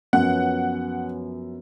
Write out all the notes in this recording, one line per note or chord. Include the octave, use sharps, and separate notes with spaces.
F#2 F3 B3 C#4 F#5